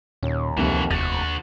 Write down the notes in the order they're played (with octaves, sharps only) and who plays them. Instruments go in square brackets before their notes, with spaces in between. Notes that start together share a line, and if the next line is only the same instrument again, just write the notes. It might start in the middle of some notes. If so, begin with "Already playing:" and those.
[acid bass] D#2 [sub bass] A#2 [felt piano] C#4
[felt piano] F1 C3 A#3 [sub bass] C#2 [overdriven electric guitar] E3 F#4
[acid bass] F1 [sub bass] D#2 [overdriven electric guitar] D3 F#4 [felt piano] A6